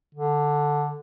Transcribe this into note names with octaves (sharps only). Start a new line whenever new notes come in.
D3